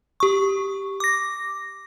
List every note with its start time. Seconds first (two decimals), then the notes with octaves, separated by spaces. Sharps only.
0.20 G4 C#6
1.00 D6 A#6